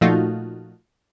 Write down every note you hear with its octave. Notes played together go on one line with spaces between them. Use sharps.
A#2 F3 A3 D#4 F4 F#4